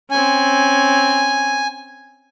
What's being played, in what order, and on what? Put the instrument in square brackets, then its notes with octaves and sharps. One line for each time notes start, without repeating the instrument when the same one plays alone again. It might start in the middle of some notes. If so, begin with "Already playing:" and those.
[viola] C4 C#4 [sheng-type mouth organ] G#5